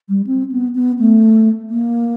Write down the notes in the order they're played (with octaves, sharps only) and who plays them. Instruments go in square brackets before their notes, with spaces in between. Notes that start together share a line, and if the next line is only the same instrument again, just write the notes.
[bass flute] G3
C4
B3
B3
A3
A#3